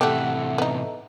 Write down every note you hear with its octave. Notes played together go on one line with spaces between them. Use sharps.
A2 C3 E3 A3 G4 A4 E5 F#5
B3 D#4